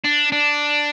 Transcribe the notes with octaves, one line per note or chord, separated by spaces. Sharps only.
D4
D4